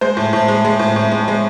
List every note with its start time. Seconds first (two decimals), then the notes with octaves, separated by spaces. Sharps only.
0.01 G#3 C5
0.17 A2
0.33 A2
0.48 G#3
0.65 G#3
0.79 A2
0.96 A2
1.12 G#3
1.28 G#3